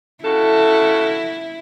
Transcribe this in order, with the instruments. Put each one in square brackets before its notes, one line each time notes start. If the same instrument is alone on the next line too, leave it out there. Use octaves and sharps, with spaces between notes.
[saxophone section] C#3 F#4 A4 [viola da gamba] E4